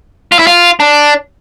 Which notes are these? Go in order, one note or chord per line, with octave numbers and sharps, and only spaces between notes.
F4
E4
F4
D4